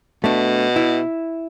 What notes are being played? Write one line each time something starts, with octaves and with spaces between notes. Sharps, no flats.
B2 A3 D4
E4